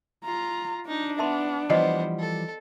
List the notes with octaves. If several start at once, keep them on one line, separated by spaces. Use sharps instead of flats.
F4 A#5
D4 D#4
B3 E5 A5 C6
E3 F3 G3 B3 C5 D5 D#5 F#5
A4